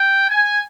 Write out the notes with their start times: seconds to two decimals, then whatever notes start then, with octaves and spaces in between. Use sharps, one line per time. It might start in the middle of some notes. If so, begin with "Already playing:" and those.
Already playing: G5
0.29 G#5